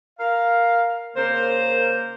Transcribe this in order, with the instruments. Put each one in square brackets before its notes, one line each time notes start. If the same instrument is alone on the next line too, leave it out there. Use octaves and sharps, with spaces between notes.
[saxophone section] A#4 F5
C#3 A#3 A#4 C5